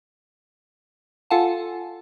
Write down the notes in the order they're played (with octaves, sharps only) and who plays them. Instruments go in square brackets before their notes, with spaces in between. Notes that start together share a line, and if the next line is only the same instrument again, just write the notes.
[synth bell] F4 A4 F5 F#5 G#5 A5